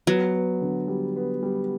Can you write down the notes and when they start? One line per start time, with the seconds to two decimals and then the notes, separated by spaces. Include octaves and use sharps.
0.07 F#3 B3
0.34 B3
0.62 D3
0.88 G3
1.16 B3
1.43 G3